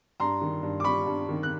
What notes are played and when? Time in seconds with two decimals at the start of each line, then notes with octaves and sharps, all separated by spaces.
0.20 G2 A#5 C6
0.41 D#3
0.63 G2
0.80 D6
0.84 G3 B5 C#6
1.07 G2
1.29 D#3
1.43 F#6